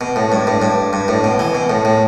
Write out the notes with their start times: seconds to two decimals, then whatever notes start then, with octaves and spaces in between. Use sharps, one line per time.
0.01 B2
0.16 A2
0.32 G2
0.47 A2
0.62 G2
0.93 G2
1.08 A2
1.24 B2
1.39 E3
1.55 B2
1.70 A2
1.85 A2